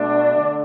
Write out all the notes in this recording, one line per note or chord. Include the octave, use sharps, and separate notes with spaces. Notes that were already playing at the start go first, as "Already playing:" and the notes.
Already playing: B2 A3 D4
D3 A3